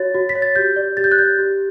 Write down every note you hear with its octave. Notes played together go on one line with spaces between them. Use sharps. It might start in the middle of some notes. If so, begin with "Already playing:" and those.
Already playing: F#4 C#5 A6
F#4
B6
C#5
A6
G4 G6
D5
G4 A6
G6
F#6
D5 G6
G4